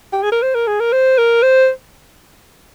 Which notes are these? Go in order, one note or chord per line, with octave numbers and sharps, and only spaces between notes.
G4
G#4
A#4
C5
A#4
G#4
A#4
C5
A#4
C5